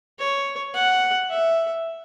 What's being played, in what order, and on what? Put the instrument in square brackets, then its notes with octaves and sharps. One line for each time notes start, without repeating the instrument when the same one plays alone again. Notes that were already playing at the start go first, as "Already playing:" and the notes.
[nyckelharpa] C#5
F#5
E5